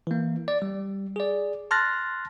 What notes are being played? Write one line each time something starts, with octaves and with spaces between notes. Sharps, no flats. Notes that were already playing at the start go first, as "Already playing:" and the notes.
E3 A#3
D5
G3
G#4 D5
A5 C6 F6 F#6 A6 A#6